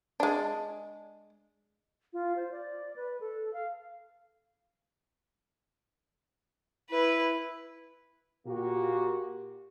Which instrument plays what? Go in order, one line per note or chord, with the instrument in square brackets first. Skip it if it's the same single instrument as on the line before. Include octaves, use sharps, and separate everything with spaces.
[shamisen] G#3 D4
[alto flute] F4
C5
D5
B4
A4
F5
[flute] E4 [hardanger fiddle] B4
[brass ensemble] A#2 A#3 F#4 G4